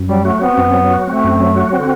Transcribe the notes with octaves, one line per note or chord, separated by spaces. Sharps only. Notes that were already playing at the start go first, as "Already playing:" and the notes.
Already playing: F#2
F#3 G3
A3 F#4
B3 C4
F#2
F#3
F#4
A3 C4
F#2
F#3
F#4
D3 C4